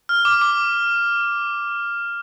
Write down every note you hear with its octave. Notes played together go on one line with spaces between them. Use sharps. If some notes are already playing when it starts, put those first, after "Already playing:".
F6
D6
D6